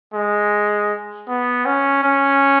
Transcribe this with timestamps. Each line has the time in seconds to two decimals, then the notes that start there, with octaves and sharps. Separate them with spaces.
0.13 G#3
1.28 B3
1.66 C#4
2.04 C#4